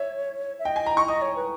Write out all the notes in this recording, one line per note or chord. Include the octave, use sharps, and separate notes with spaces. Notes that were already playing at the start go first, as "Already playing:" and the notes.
Already playing: C#5 E5
E5
D#5 G5
G#5
A#5
C#6
D#5 D#6
C#5
B4